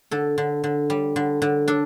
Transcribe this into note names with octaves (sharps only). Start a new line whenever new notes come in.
D3 A4
D3
D3
G3
D3
D3
D4 A4